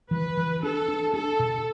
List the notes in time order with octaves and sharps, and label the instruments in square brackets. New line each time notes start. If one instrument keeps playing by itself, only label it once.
[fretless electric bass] E3 [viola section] B4
[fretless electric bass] E3
[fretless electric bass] D4 [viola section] A4
[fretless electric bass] D4
[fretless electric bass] D4 [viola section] A4
[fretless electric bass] B2